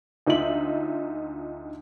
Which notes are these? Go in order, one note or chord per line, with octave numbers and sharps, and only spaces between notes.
D2 D#4 F4 E5 F#7